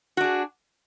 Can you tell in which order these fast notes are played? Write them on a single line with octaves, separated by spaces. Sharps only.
F#4 D4 G#4